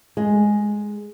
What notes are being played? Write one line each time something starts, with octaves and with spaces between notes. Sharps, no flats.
G#3